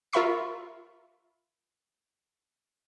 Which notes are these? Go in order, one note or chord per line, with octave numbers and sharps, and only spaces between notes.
F4 A#4 E5 B5 C#6 C7